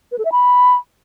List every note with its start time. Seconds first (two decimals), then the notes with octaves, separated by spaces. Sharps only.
0.12 B4
0.18 A4
0.25 E5
0.32 B5